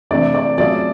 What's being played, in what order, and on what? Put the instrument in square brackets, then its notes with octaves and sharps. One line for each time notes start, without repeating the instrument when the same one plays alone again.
[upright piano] C3 E3 A3 D4 [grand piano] D5
[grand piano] D5
[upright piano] F#3 A3 C#4 F4 G#4 [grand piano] D5